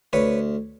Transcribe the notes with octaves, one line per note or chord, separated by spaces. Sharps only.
D2 B4 C#5